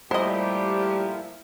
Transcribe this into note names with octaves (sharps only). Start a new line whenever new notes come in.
A#2 F3 G3 A3 E4 G4 C5 D#5